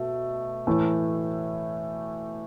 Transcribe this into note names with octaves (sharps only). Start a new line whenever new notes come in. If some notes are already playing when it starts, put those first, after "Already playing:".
Already playing: B2 A3
A2 E3 A3